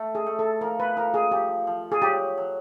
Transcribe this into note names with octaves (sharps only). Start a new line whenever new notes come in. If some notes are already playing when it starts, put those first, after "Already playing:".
Already playing: A3
G#4
A3
A4
F3 A#4
B4
F3 A#4
G#4
F3 G4
F3
G#4
F#3 G4
F#3